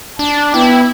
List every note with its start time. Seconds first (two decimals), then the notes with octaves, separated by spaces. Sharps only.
0.19 D4 A5
0.54 B3 E4 G5